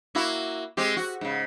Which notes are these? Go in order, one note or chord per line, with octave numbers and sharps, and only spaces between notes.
A#3 E4 F#4
G#3 C4 G4
F#4
G#2 C#3